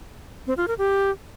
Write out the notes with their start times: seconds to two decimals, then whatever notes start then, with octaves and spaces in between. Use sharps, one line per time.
0.47 C4
0.57 F4
0.68 A#4
0.78 G4